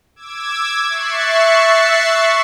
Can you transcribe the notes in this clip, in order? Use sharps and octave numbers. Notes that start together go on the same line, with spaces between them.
D6 E6 G#6
E5 C#6 F#6 A6 C7